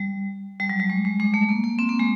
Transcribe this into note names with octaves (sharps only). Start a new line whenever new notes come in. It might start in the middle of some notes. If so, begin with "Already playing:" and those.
Already playing: G3
G3
F#3
G3
G#3
G#3
G#3
A3
A#3
A#3
C4
A#3
G#3